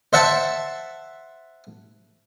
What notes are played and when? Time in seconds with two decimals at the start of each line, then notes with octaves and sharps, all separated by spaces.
0.13 C5 E5 F#5 A5